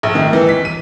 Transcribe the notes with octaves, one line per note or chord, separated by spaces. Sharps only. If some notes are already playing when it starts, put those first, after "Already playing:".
A#1
D#3
E3
B6
D#7